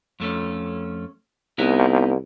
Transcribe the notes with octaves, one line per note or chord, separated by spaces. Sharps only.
F2 A3 C#4
C2 B3 D#4 E4